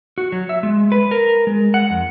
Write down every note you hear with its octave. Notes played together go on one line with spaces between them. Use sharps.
F#4
F#3
E5
G#3
B4
A#4
G#3
F#5
F2